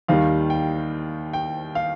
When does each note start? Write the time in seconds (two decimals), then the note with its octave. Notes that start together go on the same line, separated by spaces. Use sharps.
0.08 D#2 D#3 G3 F5
0.50 G5
1.33 G5
1.75 F5